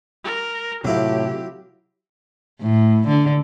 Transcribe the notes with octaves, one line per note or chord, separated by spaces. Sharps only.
A#4
A2 C3 F#3 E4 F4 G4
A2
D3